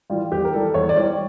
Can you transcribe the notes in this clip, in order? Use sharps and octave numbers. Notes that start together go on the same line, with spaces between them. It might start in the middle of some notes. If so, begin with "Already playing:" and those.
E3 G3 F4
E2 G4
A#4
E3 G3 A4
E2 C#5
D5
E3 G3 C#5